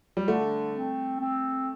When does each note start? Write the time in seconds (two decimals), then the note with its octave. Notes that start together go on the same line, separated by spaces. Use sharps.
0.17 G3
0.28 D3 A3
0.74 C4
1.21 C4